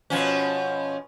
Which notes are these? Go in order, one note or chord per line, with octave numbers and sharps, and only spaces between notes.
B2 F3 C#4